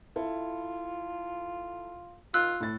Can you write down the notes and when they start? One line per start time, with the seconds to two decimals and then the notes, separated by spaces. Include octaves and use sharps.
0.16 E4 F4 A4
2.34 D#3 F4 E6 F#6
2.61 A2 A3 A6